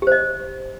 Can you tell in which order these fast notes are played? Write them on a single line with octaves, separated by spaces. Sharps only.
G4 C5 D#5